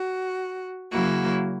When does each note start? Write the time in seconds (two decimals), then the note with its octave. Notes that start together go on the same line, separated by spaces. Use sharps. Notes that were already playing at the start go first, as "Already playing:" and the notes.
Already playing: F#4
0.91 C#3 F#3 A#3 E4 F#4